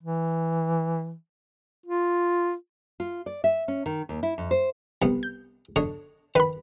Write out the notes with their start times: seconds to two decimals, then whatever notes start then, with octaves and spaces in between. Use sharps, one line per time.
0.03 E3
1.86 F4
3.00 F4
3.26 D5
3.44 E5
3.68 C#4
3.86 D#3
4.09 D#2
4.23 E4
4.38 F2
4.51 C5
5.02 C2 B3
5.23 G6
5.76 D3 C#5 D#5
6.35 D#3 B4 B5